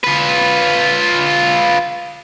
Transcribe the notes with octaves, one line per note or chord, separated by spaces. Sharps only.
F4 B4